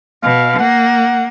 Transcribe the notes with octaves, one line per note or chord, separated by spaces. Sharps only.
B2 F5
A#3 F#5